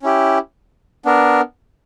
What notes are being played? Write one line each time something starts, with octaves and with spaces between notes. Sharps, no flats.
C#4 E4 G4
B3 D4 A#4